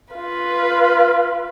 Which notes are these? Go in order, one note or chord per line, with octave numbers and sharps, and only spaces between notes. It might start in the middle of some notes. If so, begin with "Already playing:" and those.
F4 B4